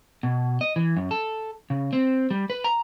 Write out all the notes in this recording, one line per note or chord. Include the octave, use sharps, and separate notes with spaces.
B2
D#5
E3
F#2
A4
C#3
C4
G3
B4
A#5